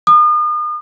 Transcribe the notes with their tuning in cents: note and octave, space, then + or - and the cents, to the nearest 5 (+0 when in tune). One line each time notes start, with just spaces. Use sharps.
D#6 -40